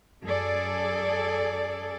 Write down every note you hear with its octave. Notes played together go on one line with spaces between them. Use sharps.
F#2 G#4 A4 D5